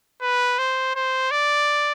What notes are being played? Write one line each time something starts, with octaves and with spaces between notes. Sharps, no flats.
B4
C5
C5
D5